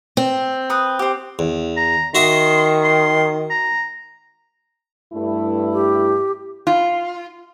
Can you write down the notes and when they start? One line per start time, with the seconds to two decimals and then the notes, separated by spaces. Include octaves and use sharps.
0.17 C4
0.70 B4 D#6
0.99 G4 C5
1.39 E2
1.77 A#5
2.15 D#3 F#4 E5 C6 D#6
2.84 C6
3.50 A#5
5.13 G2 A3 E4
5.72 G4
6.67 F4